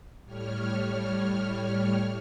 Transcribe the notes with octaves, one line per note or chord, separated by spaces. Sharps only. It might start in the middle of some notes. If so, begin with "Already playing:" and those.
A2 G3 C#5 F6